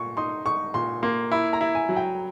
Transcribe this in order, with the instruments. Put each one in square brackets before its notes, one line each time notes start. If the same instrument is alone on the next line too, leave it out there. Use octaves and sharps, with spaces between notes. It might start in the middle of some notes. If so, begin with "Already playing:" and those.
Already playing: [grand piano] A#2 [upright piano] C#6
[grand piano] D#4 [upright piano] C6
[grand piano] D#4 [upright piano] C#6
[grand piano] A#2 [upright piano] C6
[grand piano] A#3 [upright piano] C6
[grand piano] E4 [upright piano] B5
[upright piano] A#5
[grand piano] E4
[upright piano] G#5
[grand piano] F#3
[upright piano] G5